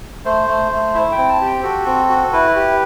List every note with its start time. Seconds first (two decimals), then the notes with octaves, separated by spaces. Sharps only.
0.25 A3 C5
0.48 A3
0.72 A3
0.94 E4 E5
1.12 G5
1.18 C4
1.29 A5
1.41 G4
1.46 G5
1.63 F#4 A4
1.86 C4
2.09 F#4
2.33 E4 B4
2.56 G4